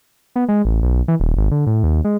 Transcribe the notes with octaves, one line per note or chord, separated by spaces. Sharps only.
B3
G#3
A1
B1
E3
D#1
G#1
D3
A2
D#2
G#3